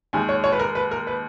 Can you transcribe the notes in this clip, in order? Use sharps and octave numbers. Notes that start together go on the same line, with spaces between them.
D#2 D#3 G#3 G#5
C#5
C#5
B4
A#4
B4
A#4
B4